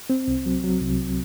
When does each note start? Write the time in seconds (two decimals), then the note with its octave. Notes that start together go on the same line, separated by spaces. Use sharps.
0.10 C4
0.28 C2
0.46 F#3
0.64 F#3
0.81 C2